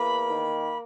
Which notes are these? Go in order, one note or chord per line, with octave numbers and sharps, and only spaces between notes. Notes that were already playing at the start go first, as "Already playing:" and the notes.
Already playing: E2 A#3 B5
D#3